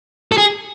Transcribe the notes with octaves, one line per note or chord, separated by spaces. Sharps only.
A4
G#4